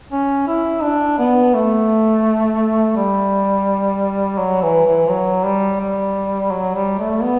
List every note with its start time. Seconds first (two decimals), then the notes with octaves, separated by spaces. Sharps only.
0.12 C#4
0.48 E4
0.83 D4
1.18 B3
1.54 A3
2.96 G3
4.39 F#3
4.62 E3
4.86 E3
5.09 F#3
5.45 G3
5.81 G3
6.51 F#3
6.75 G3
6.99 A3
7.22 B3